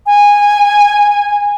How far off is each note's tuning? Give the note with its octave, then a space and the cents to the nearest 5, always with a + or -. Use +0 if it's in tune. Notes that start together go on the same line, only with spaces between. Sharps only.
G#5 -15